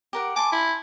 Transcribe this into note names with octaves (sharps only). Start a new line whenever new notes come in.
G4 A#4 F#5
G#5 A5 C6 D6
E4